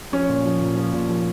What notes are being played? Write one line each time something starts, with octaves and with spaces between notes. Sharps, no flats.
F3 C#4
A#2
F3
A#2
F3
A#2
F3